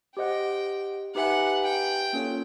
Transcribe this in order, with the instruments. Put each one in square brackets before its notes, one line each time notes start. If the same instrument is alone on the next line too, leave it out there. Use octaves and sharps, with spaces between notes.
[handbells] G4 C5 D#5 F#5 [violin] G5
[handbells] D#4 G4 B4 E5 G#5 [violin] F#5
[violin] G5
[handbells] A#3 C#4 F4 A4 C#5